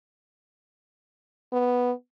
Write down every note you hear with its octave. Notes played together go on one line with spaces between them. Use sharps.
B3